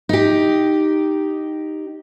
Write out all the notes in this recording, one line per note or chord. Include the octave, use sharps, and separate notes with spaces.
D#4 G4